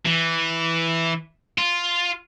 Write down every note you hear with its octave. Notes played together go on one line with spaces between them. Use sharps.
E3
F4